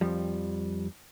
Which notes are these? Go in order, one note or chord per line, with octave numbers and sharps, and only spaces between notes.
F2 F3 G3